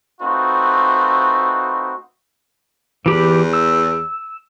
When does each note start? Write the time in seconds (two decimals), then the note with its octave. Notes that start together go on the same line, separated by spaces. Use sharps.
0.21 A3 C4 D#4 F4 F#4 B4
3.06 E2 E3 G4 B5
3.53 E6